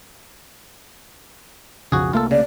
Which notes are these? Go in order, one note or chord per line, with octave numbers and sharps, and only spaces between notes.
B1 F2 C#3 F#4 G#4
C2 A3 A#3 F4 A4
C#3 D5